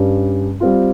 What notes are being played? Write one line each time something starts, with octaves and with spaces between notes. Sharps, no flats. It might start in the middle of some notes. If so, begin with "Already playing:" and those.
Already playing: G2 G3 C#4
G3 C4 F4